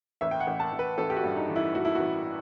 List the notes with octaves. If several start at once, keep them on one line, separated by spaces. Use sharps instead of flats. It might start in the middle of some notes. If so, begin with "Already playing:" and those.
A1 E5
G5
F#5
A1
A5
A1
B4
A1 A4
G4
F#4
G2
D#4
E3
E4
A1 F#4
E4
F#4
A1